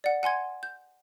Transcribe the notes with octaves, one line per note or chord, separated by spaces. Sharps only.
D5 F#5
F#5 G#5 C6 G#6
G6